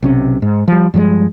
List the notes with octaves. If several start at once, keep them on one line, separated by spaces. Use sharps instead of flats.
B1 C3 C#4
G#2
F3 G3
G2 F3 F#3 G#3